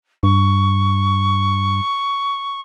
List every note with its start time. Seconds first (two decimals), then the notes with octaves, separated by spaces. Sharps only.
0.23 G2 C#6